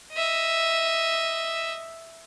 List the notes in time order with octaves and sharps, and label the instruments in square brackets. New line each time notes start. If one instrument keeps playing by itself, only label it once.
[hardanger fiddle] D#5 E5